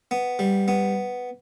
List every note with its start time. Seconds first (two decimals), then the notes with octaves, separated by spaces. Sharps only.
0.11 B3
0.39 G3
0.68 B3